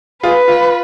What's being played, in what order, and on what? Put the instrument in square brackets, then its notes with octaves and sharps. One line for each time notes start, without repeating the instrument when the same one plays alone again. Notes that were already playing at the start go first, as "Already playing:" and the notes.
[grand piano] F4 G#4 [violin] B4
[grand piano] F4